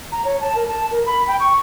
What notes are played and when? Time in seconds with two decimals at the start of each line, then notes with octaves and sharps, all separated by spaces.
0.12 A#5
0.25 C#5
0.41 A5
0.55 A#4
0.68 A5
0.91 A#4
1.06 B5
1.27 G5
1.40 C#6